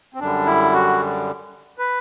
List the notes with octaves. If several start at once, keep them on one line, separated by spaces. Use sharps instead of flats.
C4
F#2 D3 G3 D4
E4
F#4
B4